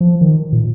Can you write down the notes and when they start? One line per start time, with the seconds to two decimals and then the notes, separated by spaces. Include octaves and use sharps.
0.01 F3
0.21 D#3
0.52 A#2